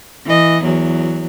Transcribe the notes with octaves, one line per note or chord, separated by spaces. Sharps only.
E3 D#5
E2 F#3